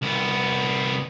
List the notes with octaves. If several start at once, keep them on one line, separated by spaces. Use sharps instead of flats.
C2 B3